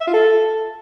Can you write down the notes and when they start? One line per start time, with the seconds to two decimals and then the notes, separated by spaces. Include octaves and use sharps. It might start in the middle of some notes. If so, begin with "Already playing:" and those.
0.01 E5
0.07 F4
0.14 A4